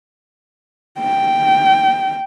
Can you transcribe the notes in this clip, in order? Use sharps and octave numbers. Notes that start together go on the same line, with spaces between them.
G5